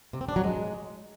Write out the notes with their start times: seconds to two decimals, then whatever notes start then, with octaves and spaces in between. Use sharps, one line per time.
0.13 C3
0.21 C4
0.29 D4
0.36 F#3
0.44 G#3